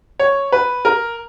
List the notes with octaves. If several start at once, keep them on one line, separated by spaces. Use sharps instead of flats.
C#5
B4
A#4